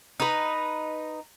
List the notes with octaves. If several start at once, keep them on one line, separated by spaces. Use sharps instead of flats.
D#4 B4